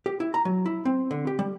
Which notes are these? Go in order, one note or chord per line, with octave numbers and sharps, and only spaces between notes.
G4
E4
A#5
F#3
E4
C4
D3
G4
G3